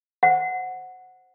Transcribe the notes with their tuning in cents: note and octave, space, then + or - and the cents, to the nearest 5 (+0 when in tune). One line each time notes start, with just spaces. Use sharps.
C5 +0 F#5 +0